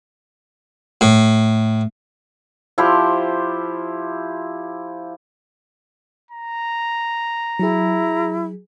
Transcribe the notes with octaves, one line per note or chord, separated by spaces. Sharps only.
A2
F3 E4 G4 C5
A#5
F#3 E4 G#4